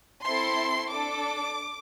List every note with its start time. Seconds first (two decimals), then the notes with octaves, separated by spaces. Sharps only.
0.24 C4 E4 A4 C6
0.91 D4 A4 D6